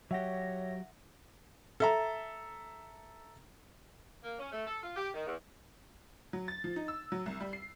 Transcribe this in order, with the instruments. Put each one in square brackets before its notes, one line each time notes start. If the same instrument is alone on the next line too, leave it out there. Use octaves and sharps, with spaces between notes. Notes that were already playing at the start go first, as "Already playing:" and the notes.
[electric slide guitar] F#3 G4 [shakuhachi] C#5 [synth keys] E5 F#5 A#6
[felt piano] A4 E5 A#5
[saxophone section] A#3
C#4
A3
A4
F4
G4
D#3
E2
[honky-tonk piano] F#3
A6
F3
D#4
E6
F#3
C2
G3
C7